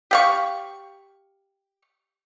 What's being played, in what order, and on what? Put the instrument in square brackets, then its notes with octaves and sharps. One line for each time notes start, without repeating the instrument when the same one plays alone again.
[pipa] G4 F5 C#6